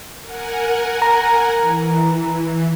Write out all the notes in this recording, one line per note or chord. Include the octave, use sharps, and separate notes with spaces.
A#4 F#5 G#5
A#5
E3